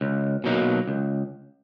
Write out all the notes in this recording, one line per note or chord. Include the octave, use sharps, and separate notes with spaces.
C#2
B2 F#3 A#3 D#4
C#2